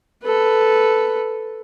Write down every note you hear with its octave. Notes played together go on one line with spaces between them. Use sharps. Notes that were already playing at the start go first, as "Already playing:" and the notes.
A4 B4